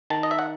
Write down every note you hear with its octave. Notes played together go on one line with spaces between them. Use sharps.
D#3 A5
D#5
E5
F#5